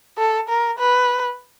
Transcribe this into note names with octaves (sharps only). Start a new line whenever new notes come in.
A4
A#4
B4